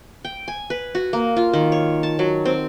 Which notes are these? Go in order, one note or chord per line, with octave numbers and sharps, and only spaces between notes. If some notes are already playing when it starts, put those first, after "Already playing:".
G5
G#5
B4
F#4
A#3
F4
D#3
C#5
A5
F#3
C4